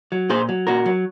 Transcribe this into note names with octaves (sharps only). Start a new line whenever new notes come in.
F#3
A#2 G#4 C5
F#3
A#2 F#4 A#4
F#3